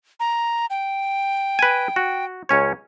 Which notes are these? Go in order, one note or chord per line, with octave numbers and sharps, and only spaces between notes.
A#5
G5
B4 G#5
F#4
C#2 C#4 C#5